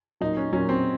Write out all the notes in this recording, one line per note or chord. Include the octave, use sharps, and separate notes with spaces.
A#2 F#3 D#4
C#4
A#2 F#3 C#4
C4